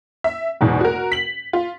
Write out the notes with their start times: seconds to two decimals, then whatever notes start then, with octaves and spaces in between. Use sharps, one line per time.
0.24 E5
0.61 F#1 E2 G#2 B2
0.81 F#4 A#4
1.12 B6 F#7
1.53 F4